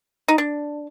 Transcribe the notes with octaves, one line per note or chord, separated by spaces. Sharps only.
D#4
D4